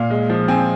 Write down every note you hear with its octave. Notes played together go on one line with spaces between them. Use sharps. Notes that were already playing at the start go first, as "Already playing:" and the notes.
Already playing: A#2 F5
G#3
F3
C4 G#5